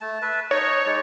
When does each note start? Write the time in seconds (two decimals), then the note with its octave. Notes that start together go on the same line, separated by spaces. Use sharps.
0.01 A3 A5
0.22 B4 E5 A5
0.51 D#4 C#5 D#5
0.86 G#3 D#4 D5